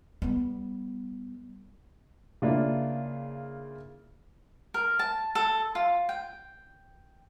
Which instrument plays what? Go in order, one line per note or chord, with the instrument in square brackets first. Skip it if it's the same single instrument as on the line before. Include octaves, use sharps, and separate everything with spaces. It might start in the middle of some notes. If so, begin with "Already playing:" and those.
[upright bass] G3 B3
[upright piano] C#3 A#3 D4 E4 F4
[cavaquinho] A#4
A5
A4
F4
G5